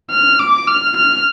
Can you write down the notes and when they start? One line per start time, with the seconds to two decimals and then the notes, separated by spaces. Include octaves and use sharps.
0.11 F6
0.39 D6
0.67 F6
0.96 F6